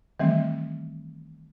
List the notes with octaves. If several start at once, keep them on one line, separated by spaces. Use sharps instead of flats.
D#3 E3 G3 A3 C4